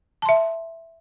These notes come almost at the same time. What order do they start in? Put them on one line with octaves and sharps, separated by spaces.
A5 C6 E5